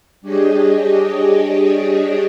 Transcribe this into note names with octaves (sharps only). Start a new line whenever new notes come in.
G3 D4 G4 G#4 C#5 D#5